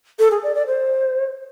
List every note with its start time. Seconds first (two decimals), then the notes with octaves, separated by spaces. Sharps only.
0.19 A4
0.31 G#4
0.43 D5
0.55 D5
0.67 C5